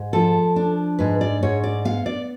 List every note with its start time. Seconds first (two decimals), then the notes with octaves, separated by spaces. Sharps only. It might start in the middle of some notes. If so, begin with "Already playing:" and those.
Already playing: G#2
0.13 F3 A4
0.56 D4
0.99 G#2 B4
1.21 D5
1.43 G#2 C#5
1.64 D5
1.85 B3 F5
2.06 D5